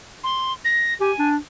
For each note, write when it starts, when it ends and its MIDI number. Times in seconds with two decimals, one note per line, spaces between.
0.24 0.53 84
0.65 0.94 94
1.00 1.12 67
1.00 1.29 80
1.19 1.37 62